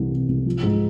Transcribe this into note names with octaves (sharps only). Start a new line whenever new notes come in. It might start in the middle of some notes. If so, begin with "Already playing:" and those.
Already playing: C2 C3 E3
C3
C2
F3
G#2